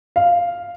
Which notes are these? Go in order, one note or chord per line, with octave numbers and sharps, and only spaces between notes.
F5